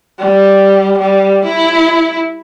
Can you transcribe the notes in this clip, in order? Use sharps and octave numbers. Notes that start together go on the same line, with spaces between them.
G3
G3
E4